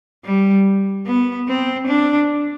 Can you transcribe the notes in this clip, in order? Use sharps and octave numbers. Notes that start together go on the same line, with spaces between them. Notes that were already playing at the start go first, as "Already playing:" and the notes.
G3
B3
C4
D4